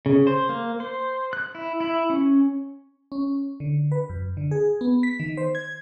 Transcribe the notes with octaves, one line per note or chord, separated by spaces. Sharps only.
C#3
C5
A#3
C5
F#6
E4
E4
C#4
C#4
D3
B4
F#2
D3
G#4
B3
B6
D#3
C5
G#6